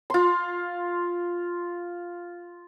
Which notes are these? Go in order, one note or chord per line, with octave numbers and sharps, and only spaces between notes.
F4 C6